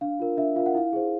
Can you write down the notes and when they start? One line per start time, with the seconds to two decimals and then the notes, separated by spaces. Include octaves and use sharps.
0.01 D4 F5
0.20 F4 A#4
0.37 D4 E5
0.56 F4 A#4 F5
0.66 F#5
0.75 E4 F5
0.93 G#4 C5